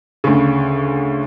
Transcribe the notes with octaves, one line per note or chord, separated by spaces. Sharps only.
D2 C#3